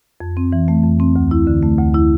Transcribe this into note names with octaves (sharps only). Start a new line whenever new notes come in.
F2
C4
E3
A3
F2
C4
D2
E4
D3
A3
D2
E4